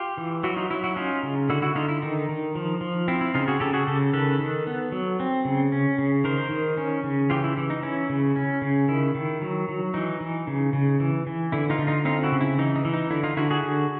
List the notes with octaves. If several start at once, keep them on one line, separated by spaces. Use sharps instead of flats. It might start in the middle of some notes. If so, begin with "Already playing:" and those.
Already playing: F4 G4
E3
F#3 E4 F#4
D#4 F4
F#3 E4
E4 F#4
C#4 D#4 F4
C#3
D3 E4 F#4
E4 F#4
D3 D#4 F4
E4
D#3 D#4
D#3
F3
F3
C4 E4
E4
C#3 D#4 F4
F#4 G#4
C#3 G4 A4
F#4 G#4
C#3 G4 A4
D#3 A4 B4
D#3
B3
F#3
C4
C#3
C#4
C#3
D#3 A#4 C5
D#3
C#4
C#3
E3 F4 G4
E4
E3
D#4
C#4 E4
C#3
C#4
C#3
D#3 E4
D#3
F#3
F#3
E3 D#4
E3
C#3
C#3
E3
E3
D3 E4
D#4 F4
D3
D#4 F4
C4 D#4 F4
E4 F#4
C#3
E4
E3 D#4
D#4
E3
D#4
D3 E4
D#4 F4
D3 E4 F#4
F#4 G#4
D3